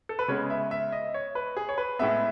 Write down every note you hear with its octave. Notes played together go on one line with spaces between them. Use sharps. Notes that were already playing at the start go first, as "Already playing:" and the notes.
A4
B4
C#3 G#3 B3 C#5
E5
E5
D#5
C#5
B4
G#4
C#5
B4
A2 G#3 B3 E5